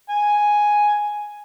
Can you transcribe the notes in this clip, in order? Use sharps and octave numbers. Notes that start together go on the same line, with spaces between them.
G#5